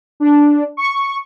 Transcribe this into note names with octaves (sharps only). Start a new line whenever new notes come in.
D4
C#6